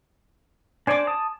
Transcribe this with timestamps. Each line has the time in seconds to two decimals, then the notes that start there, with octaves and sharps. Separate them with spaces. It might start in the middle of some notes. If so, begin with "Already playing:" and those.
0.87 D4 C5 D5 G#5 D6
1.07 A5 D#6